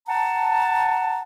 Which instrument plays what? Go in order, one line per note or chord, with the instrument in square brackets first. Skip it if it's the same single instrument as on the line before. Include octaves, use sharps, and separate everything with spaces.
[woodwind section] F#5 A5 [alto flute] A#5